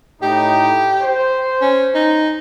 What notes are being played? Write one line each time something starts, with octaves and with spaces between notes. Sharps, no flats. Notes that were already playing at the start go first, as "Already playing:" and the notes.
A2 D#4 G4
C5
C#4
D#4